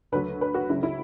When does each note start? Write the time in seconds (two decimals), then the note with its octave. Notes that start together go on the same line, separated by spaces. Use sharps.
0.12 D2 D3 F#3 B4
0.41 B4
0.54 F#4
0.69 C#2 C#3 F#3 E4
0.83 E4